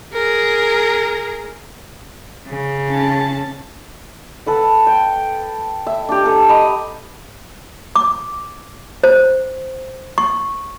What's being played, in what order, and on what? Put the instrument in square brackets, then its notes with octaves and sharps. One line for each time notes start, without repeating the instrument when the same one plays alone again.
[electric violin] G#4 A#4
[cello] C#3
[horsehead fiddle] C#4 A5
[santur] A4 B4 F#5
G5
E5
D4 G4
A4 A#5
D#5 A#5 B5
[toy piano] D6
C5
C#6